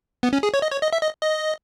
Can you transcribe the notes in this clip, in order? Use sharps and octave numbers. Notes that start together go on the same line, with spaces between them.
B3
C#4
G#4
C#5
D#5
C#5
D#5
E5
D#5
D#5